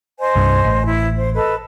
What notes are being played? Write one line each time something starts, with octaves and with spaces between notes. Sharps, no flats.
C5 D#5 G#5
C2 G2
A1
E4
C5
A4 B4 D#5